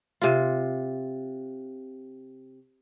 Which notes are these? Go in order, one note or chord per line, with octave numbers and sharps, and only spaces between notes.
C3 F4